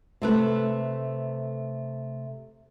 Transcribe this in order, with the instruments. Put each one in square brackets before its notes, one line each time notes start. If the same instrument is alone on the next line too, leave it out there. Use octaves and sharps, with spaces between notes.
[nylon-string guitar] C3 A3 B4